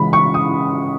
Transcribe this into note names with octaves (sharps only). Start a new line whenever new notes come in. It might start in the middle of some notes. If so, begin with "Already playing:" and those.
Already playing: C#3 E3 G#3 B5
C#6
D#6